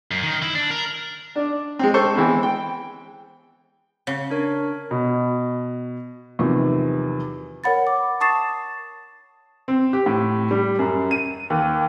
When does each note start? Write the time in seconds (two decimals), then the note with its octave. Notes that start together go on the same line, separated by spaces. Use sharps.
0.11 F#2
0.23 D#3
0.42 E4
0.55 D4
0.70 A#4
1.36 D4
1.79 G#3 C4
1.94 A4 C5 C#6
2.15 E3 G#3 B3 C4
2.43 G5
4.07 C#3
4.30 D4 A#4 C#5
4.91 B2
6.39 E2 C3 D#3 F3 F#3
7.64 A#4 C#5 F#5 B5 A6
7.87 D6
8.20 A5 C#6 D#6 A6 C7 E7
9.68 C4
9.93 G4
10.06 A2
10.51 G3
10.79 F#2
11.11 D#7
11.50 D#2